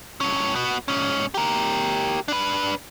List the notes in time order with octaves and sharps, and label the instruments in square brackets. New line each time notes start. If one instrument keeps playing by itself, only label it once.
[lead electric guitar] G2 C#4
B3 F#4
G#2 C#4
G4 A#4
D4 B4